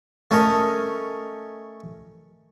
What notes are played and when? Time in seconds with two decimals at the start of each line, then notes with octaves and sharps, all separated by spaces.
0.31 A3 C#4 A#4 D#5